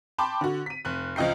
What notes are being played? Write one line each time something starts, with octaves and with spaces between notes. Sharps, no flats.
G5 A5 B5 C6 D6
D3 F#4
B6 D#7
F1 F#6
C#2 F3 D#5 G5 C7